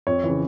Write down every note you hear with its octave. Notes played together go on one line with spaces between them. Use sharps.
F2 C#5
C#3 E3